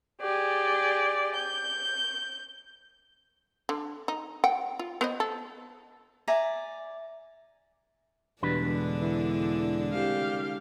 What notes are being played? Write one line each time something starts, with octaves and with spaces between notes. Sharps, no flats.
G4 G#4 D5
G6
D3
D#4
F#5 G5
F4
B3 C5 D#5
A4
D5 E5 G#5 A#5
E2 G2 B2 D3 G#3 D4 B4
E3
C2 G4 F5